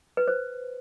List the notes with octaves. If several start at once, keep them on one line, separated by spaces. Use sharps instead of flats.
B4
C5